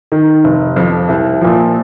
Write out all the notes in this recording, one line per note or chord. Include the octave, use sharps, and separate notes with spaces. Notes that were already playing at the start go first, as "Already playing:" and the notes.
D#3
F1
F2 F3
C2
A#2 F3